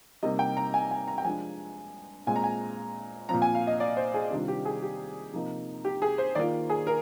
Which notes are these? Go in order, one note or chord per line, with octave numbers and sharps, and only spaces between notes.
C3 G3 A#3 D#4 D#5
G5
A#5
G#5
G#5
A#5
G5
F3 G#3 D4 G#5
A#2 G#3 C4 G#5
A#5
G#5
A#2 F3 C4 A#5
G#5
F5
D#5
D5
C5
G#4
C3 D#3 G3 D4 F4
G4
G#4
G4
C3 F3 A#3 D#4
G4
G#4
C5
D#3 A#3 F4 D5
G#4
A#4